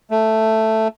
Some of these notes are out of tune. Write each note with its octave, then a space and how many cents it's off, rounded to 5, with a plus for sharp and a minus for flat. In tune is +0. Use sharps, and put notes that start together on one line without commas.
A3 +5